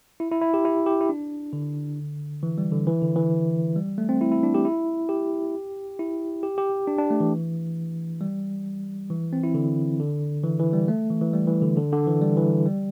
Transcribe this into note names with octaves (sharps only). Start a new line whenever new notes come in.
E4
E4
E4
G4
E4
G4
E4
D4
D3
E3
G3
D3
E3
D3
E3
G3
A3
C4
E4
E4
D4
G4
E4
G4
E4
G4
G4
D4
D4
A3
E3
G3
E3
C4
E4
D3
D3
E3
E3
G3
A3
E3
E3
G3
E3
D3
D3
D3
E3
G3
E3
G3